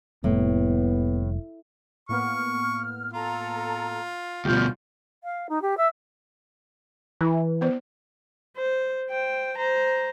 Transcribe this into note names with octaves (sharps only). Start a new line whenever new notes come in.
F1 A2 G3 A#3 B3
A2 A#3 B3 C#6 F6
F4 A4 A#5
D2 B2 G3 F4 F6 G6
F5
D#4
G4
E5
E3 E4
B3 C5 D5
C5
C5 G5
C5 A#5